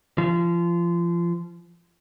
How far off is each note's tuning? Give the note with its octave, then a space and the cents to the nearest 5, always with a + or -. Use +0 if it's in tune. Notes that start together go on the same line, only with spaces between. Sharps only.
F3 -30